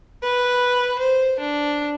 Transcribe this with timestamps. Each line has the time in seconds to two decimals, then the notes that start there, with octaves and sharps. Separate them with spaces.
0.23 B4
0.99 C5
1.39 D4